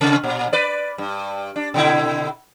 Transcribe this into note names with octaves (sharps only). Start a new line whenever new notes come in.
C3
A#2
B4 D5
G2
D4
B2 D3 E4